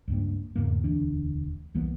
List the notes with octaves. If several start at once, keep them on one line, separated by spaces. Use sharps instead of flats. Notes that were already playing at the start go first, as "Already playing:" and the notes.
C#2 G2 A#3
E2 G#2 C#3 A#3
E1 D2 E3 D4
C2 E3 A#3 B3